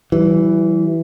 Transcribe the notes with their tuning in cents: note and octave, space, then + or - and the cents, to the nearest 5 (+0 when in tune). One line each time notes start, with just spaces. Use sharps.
E3 +0 G3 -45